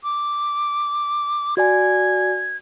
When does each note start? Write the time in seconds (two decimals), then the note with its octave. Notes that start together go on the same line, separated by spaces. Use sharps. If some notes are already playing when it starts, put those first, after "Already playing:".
0.04 D6
1.57 F#4 D5 G#5 G#6